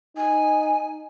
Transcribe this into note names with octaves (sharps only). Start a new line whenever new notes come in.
D#4 G#5